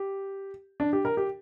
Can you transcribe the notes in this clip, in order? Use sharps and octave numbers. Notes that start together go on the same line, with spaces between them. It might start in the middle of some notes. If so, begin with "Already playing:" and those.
Already playing: G4
D4
G4
A#4
G4